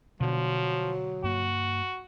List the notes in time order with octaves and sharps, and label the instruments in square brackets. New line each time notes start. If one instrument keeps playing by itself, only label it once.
[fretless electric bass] B2 D3 [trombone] F3 [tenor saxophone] F#3
[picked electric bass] G2 A#3 [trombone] F#4